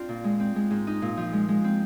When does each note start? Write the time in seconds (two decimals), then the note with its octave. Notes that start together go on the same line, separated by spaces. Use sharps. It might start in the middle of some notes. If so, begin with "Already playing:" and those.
Already playing: C4 D4 F4
0.09 A#2
0.24 G#3
0.40 C4
0.56 G#3
0.71 G#2
0.87 D#4
1.02 A#2
1.17 F3
1.33 G#3
1.49 G#3
1.64 C4